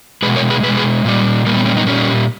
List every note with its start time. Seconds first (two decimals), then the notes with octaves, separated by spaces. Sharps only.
0.22 G#3 G#4 B4
0.27 B2
0.36 A#4 C#5
0.50 G#4 B4
0.63 B2 G#4 B4
0.68 G#3
0.77 G#4 B4
1.05 A#2 G3
1.46 A#2 G3 A#3
1.57 B3
1.66 A#3 C#4
1.77 B3 D#4
1.86 A#2 G3 A#3 C#4